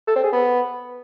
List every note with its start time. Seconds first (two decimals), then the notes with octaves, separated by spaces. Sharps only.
0.08 A4
0.16 C4
0.24 G#4
0.32 B3